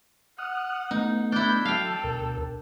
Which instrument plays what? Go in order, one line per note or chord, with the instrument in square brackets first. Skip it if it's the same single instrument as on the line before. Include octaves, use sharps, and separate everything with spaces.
[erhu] F#5 [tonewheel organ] D#6 F6 F#6
[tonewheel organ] A3 B3 [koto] D#4
[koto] D4 E4 [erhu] G6
[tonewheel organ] F#3 [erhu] A4 [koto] F5 G5
[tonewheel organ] D2 B2 A#4